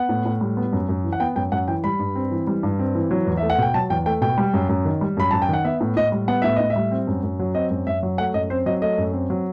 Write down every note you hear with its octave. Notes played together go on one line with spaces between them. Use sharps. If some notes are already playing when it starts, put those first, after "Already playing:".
Already playing: B3 F#5
A2
A2
G3
B3
F#2
F#2
E3
F#5
B3 G5
F#2 G5
F#2 F#5
E3 G5
G3 B5
G2
C4
E3
G3
G2
C4
E3
F#3
E2
E5
A3
F#5
B2 G5
F#3 A5
E2 G5
A3 G5
B2 G5
G3
F#2
F#2
D#3
G3
F#2 B5
F#2 A5
G5
D#3 F#5
B3 E5
A2
A2 D#5
G3
B3 F#5
A2 E5
A2 D#5
E5
G3
C4
F#2
F#2
F#3
C4 D#5
F#2
F#2 E5
F#3
A3 F#5
F#2 D#5
C4 C5
F#3 D#5
A3 D#5
F#2
C4
F#3